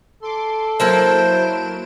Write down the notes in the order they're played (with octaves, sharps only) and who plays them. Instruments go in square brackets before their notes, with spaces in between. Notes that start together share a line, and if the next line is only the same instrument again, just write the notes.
[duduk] A4 [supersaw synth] C6 D6
[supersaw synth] F#3 D7 E7 [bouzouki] A#3 E4 A5 [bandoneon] C5